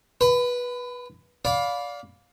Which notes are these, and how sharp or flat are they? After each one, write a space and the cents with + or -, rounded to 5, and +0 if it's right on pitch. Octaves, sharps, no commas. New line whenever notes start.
B4 -15 B5 +30
D5 -20 F5 +20 B5 +0